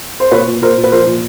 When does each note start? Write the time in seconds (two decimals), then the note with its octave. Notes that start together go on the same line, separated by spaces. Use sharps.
0.20 C5
0.31 A#2 B4 C#5
0.47 A#2
0.61 A#2 A#4 C5
0.78 A#2
0.84 B4
0.92 F3 A#4 C5
1.07 A#2